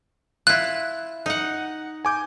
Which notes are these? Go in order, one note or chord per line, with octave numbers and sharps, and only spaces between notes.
E4 F4 F#6
D#4 F#5
G#5 D6 G6